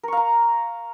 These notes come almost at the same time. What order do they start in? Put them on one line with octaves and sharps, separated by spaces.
A#4 C#6 F5 A#5